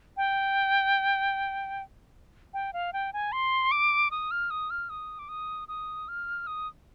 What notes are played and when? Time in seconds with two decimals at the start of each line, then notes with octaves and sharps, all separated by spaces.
0.17 G5
2.54 G5
2.73 F5
2.93 G5
3.13 G#5
3.32 C6
3.72 D6
4.11 D#6
4.31 F6
4.50 D#6
4.70 F6
4.90 D#6
5.19 D6
5.29 D#6
5.68 D#6
6.08 F6
6.47 D#6